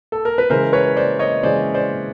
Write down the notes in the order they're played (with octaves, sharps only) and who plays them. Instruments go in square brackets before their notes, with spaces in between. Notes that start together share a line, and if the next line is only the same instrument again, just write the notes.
[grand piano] A4
A#4
B4
C#3 E3 G#3 A#4 C5
B4 C#5
C5 D5
C#5 D#5
C#3 E3 G#3 C5 D5
C5 D5